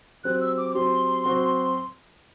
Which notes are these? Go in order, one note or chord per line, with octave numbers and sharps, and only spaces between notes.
F#3 C4 G4 F#6
E6
D6
D6
F#3 C4 G4 C6
F#3 C4 F#4